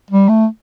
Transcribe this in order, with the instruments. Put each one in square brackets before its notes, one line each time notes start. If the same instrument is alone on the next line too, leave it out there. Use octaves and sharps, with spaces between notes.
[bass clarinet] G3
A3